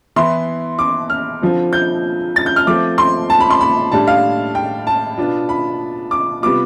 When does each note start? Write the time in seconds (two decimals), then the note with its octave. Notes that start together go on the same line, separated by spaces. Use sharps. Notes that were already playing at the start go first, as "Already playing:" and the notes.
0.16 E3 B3 E4 C6
0.79 D6
1.10 F6
1.42 D3 F3 C4 F4
1.73 G6
2.36 A6
2.46 G6
2.56 F6
2.67 F3 A3 C4 D6
2.98 C6
3.30 A5
3.40 B5
3.50 C6
3.61 B5
3.92 A2 G3 D4 A5
4.08 F5
4.55 G5
4.87 A5
5.18 B2 B3 D4 F4
5.49 B5
6.11 D6
6.42 C3 G3 B3 F4 D6